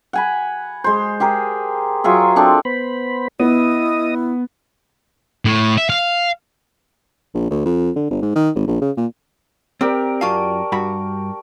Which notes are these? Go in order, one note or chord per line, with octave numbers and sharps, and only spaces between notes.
F#5 G#5 B5
G#3 C5
G4 G#4 A#4
F#3 F4 G#4 E5
C4 D4 A4
B3 C5 B5
B3 E4 D#5 D#6
A2
E5
F5
A#1
D2
F2
D3
G1
G#2
D#3
G#1
A#1
C#3
A#2
C4 G4 A#4 D5
F#2 F4 F5 A5 C#6
G2 F#4 B5